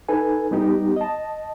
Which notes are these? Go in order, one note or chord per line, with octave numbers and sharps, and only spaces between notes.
D#4 A4 B4 G#5
G3 B3 D#4 G4
D#5 A5